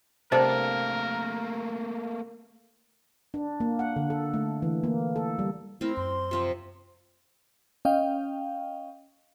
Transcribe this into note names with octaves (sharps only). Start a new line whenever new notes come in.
C3 A3 A#3 D4 A4 A#4 C5
D4
A#3
F#5
D3
A4
A3
E3
A#3
A4
G3
A3 C4 E4 A#4
F#2 C6
C3 F3 G4
C#4 D#5 F5 G5